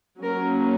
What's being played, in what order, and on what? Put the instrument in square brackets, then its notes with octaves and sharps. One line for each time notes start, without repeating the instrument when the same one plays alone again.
[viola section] F#3 A#3 C#4 A#4